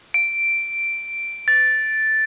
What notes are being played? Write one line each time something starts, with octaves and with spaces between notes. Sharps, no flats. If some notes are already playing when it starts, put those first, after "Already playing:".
D7
A6